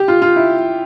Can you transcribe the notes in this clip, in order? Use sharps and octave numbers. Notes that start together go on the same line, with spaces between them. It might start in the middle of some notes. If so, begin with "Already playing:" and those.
Already playing: G4
F4
F4
E4